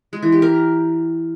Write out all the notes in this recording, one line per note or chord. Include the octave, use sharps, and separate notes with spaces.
G#3
E3
G4
A#4